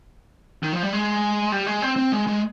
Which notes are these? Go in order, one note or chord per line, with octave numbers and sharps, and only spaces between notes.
D#3
F3
G3
G#3
G3
G#3
C4
C4
G#3
G#3